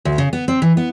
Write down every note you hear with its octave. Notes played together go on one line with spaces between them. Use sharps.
D2
C#3
B3
C4
E3
B3